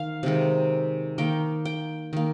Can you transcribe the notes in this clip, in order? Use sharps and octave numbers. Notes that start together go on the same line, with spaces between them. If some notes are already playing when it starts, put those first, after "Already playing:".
Already playing: D#3 F5
C3 D#3 G#3
D#3 A#3 G5
G5
D#3 A#3